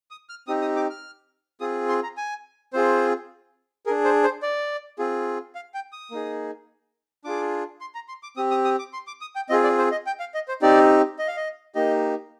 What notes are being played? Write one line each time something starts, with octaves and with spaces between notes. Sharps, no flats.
D#6
F6
C4 D#4 G4 D#6
D#6
D6
F6
C4 F4 G#4 D#6
C6
A#5
G#5
C4 F4 G#4 C5
D4 G#4 A#4
C5
C5
D5
C4 F4 G#4
F5
G5
D#6
A#3 D#4 G#4
D4 F4 G#4 D6
C6
A#5
C6
D6
C4 G4 D#6
D#6
D#6
D6
C6
D6
D#6
G5
C4 F4 G#4 D#5
D5
C5
D#5
G5
F5
D#5
C5
C4 D#4 G4 D5
D#5
F5
D#5
A#3 D#4 G4 D#5